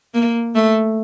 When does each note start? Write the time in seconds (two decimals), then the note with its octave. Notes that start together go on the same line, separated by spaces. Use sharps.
0.14 A#3
0.55 A3